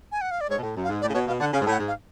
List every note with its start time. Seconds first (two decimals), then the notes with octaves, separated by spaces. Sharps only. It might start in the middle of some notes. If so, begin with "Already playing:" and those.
0.12 G#5
0.21 F#5
0.31 F5
0.41 D5
0.49 G#2 C#5
0.58 B2
0.63 A2
0.76 F#2
0.84 F5
0.89 G#2
1.02 A2 D5
1.09 C#3
1.14 B2 C#5
1.27 B2 F5
1.40 D3 F#5
1.53 C#3 F5
1.61 G#2
1.66 A2 F#5
1.80 G#2
1.88 F5